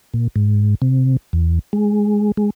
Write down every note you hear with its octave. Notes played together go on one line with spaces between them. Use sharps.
A#2
G#2
C3
E2
G#3
G#3